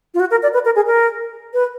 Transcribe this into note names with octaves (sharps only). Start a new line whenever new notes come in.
F4
F#4
A#4
D5
B4
A#4
G#4
A#4
B4